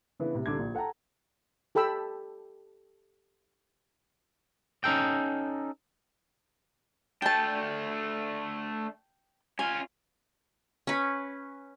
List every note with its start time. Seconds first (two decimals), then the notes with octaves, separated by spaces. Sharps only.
0.20 C#3 E3 B3 D4
0.34 A1 C3
0.46 C2 D3 D6 G#6
0.59 A#1
0.75 A4 F#5 G5 A5 A#5
1.75 G4 A4 G5 B5 E6
4.84 C#4 D#4 A4 G5
7.22 A3 D4 G5 A5
9.59 C#4 F4 G#5
10.87 C#4 B4